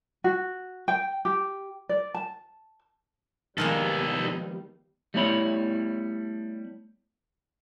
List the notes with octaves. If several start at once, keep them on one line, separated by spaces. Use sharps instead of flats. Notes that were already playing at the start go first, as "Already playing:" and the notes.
F#4
G5
G4
D5
A5
D#3 F3 G3 G#3 A#3 B3 D#4 A4
G3 A3 B3 E4 C#5 B5